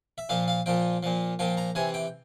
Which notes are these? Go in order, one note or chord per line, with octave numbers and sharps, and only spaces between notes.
E5
A#2 F3 F5
F5
A#2 F3 G5
A#2 F3
A#2 F3 G5
A#5
C3 E3 G#5
G5